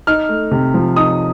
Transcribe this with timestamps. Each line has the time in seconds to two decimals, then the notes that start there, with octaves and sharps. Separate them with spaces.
0.07 D#4 F6
0.29 A3
0.51 C3
0.74 F3
0.96 D#4 D#6